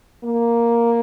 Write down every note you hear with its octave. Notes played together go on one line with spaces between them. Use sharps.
A#3